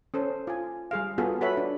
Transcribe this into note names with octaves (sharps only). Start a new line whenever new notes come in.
C#4 A4 C5
F4 G#5
G3 G#4 F5
B3 F4 F#4 G#4 A4
F#4 A4 B4 C#5 E5 B5
D4